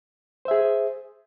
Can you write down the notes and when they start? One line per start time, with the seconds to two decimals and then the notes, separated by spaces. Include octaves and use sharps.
0.45 C5
0.48 E5
0.51 G#4